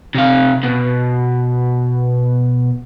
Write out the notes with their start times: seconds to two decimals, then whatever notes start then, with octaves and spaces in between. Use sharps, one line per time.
0.15 C3 F5
0.63 B2